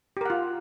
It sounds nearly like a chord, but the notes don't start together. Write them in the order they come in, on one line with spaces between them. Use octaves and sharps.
G4 A#4 F#5 F4